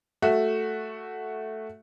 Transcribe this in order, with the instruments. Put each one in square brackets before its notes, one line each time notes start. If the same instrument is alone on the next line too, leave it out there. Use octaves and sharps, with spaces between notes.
[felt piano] A3 F#4 E5